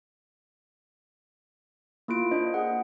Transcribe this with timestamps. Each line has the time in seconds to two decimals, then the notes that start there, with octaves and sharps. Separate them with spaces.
2.08 A#3 E4 F4 D7
2.31 A#3 D4 C5 D#5
2.54 G#4 F#5